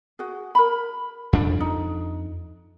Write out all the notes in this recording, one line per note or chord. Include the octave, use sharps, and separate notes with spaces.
F#4 G#4
A#4 B5
F2 D4
D#4